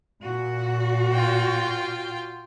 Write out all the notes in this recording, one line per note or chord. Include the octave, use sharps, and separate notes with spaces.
A#2 F#4
F4 G5